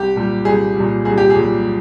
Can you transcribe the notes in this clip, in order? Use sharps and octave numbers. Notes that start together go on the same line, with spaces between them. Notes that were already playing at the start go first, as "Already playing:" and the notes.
Already playing: C2 G4
A#2 G3
C2 G#4
A#2 G3
C2 G#4
G4
G#4
A#2 G3